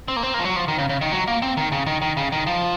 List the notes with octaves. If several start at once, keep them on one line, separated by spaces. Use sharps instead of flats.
C4
A#3
C4
A#3
F3
F#3
F3
D#3
C#3
C#3
D#3
F#3
A#3
C4
D#3
C#3
D#3
D#3
C#3
D#3
F3